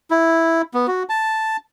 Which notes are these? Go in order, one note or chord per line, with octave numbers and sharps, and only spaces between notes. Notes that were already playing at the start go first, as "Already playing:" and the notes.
E4
B3
F#4
A5